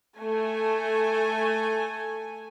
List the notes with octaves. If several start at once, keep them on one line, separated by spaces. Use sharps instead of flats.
A3 G#5